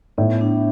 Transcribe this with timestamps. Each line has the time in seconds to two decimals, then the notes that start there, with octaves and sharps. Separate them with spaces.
0.18 A2 B3
0.41 D4